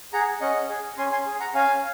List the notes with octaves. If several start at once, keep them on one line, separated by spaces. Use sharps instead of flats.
G#4 F#5 A#5
C#4 D#5 F#5
G#4
C#4 G#5 C6
G#5 C6
G#4
F#5 A#5
C#4 F5 G#5